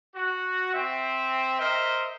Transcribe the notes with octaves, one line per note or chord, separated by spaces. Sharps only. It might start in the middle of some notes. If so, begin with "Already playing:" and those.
F#4
C4 E5
A#4 C5 D#5 E5